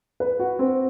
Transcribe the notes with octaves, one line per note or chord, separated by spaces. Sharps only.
B4
F#4
C4